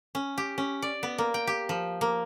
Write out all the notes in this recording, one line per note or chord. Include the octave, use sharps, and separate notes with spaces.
C#4
G4
C#4
D5
B3
A#3
G5
G4
F3
A#3